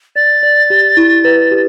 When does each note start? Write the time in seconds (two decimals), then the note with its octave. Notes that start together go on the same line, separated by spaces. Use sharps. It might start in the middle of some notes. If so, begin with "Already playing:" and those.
0.16 D5 A6
0.43 D5
0.70 G4
0.97 E4
1.24 B4
1.51 G4